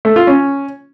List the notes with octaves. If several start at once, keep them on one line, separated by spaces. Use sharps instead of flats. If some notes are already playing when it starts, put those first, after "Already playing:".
A3
F4
C#4